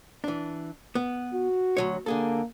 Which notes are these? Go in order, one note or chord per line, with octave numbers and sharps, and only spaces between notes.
E3 D4
B3
F#4
D2 F#3 C#5
D3 A#3 G#4 A4